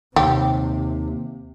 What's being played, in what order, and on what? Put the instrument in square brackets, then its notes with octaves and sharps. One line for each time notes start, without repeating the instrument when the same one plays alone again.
[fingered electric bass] D#2 [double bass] C3 [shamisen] G4